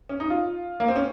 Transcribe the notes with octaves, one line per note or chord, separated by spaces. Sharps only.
C#4
D#4
F4
A#3
C4
C#4